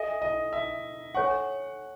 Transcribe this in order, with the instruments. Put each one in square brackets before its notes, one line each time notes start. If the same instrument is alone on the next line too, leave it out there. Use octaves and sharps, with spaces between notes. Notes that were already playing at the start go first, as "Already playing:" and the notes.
Already playing: [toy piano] A4 E5 G#5 [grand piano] D#5
[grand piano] D#5
E5
[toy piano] A4 C#5 G#5 C#6 [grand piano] F#5